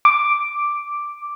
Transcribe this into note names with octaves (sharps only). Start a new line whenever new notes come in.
D6